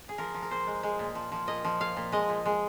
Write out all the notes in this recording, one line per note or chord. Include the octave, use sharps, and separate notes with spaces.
G#4
F3 A#4
F3
A#4
A#2 C5
G#3
G#3
A#2
F3
F3
A#2 D#5
F3
A#2 F5
A#2
G#3 D#5
A#2
G#3